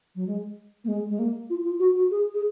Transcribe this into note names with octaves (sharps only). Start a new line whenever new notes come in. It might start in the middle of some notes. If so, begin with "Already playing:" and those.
F#3
G#3
A#3
G#3
G#3
A#3
F4
F4
F#4
F#4
G#4
G#4